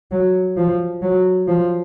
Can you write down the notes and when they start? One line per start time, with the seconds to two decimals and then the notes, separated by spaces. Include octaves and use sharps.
0.12 F#3
0.57 F3
1.02 F#3
1.48 F3